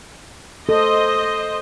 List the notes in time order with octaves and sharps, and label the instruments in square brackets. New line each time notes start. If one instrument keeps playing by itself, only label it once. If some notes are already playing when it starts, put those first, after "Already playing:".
[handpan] A4 [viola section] C5 D#5